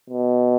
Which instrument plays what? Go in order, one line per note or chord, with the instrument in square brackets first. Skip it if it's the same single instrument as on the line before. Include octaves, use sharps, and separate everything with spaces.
[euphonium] B2